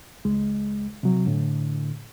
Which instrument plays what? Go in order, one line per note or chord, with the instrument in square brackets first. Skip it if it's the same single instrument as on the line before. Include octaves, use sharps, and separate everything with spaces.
[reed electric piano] C#2 G#3
C3 F#3
A2 D3